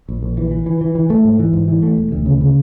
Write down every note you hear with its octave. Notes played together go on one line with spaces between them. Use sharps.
A#1
A#1
E3
E3
E3
E3
E3
A3
G#2
E3
G#2
E3
A3
E1
D2
C#3
C#3